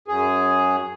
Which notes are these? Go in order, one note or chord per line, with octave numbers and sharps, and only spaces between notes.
F#2 G#4